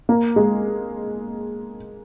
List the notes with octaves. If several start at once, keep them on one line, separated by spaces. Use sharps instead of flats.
A#3
G#3